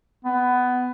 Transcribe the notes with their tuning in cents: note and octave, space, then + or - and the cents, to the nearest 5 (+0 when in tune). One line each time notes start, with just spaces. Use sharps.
B3 +15